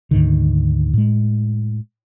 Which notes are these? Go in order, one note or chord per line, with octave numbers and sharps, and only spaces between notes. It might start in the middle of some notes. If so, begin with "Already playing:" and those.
D2 G#2 D3 D#3
A2 G#3